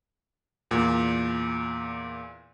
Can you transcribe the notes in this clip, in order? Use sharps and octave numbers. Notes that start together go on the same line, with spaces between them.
E2 A#2